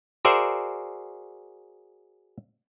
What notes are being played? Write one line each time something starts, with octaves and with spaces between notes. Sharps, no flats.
F#4 G#4 A#4 C5 D5 E5